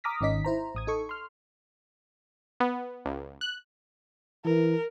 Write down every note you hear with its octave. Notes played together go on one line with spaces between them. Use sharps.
A#5 D6 D#6 F6 A#6 B6
G#1 D#3 C#4 D#4 D#5 B6
E4 C5 A#5
A1 D#6 G#6
D#4 A4 C#6
C6 F6
B3
C#2
F#6
E3 A#4